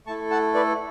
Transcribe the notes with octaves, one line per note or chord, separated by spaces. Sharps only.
A3 E4 A4 A5 C#6
F#5 A5
B4 D5